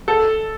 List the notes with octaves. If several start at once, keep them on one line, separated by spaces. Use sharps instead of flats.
A4